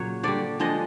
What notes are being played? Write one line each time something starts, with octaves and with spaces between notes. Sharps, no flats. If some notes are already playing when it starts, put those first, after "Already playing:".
Already playing: A#2 C#3 F#3 C#5
D3 G3 D5
D3 F3 G#3 D#5